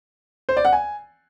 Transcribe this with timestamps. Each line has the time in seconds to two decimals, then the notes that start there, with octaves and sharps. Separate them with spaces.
0.49 C5
0.57 D5
0.65 F#5
0.73 G#5